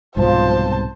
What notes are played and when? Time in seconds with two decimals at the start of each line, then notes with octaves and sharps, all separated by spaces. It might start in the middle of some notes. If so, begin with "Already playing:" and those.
0.17 C2 G#2 B2 F3 C5 A5